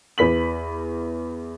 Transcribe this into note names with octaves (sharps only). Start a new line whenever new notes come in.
E2 B4 B6 F#7